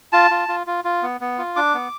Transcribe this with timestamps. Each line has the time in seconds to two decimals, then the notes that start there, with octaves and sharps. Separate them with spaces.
0.12 F4 A5
0.31 F4
0.48 F4
0.67 F4
0.84 F4
1.02 B3
1.21 B3
1.38 F4
1.56 D4 D6
1.74 B3